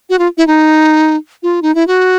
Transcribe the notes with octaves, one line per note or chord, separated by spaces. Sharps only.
F#4
F4
E4
D#4
F4
D#4
E4
F#4